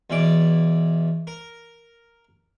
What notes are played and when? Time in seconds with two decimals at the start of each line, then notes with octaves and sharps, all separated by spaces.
0.10 E2 B2 E3 D5 D6
1.27 A#4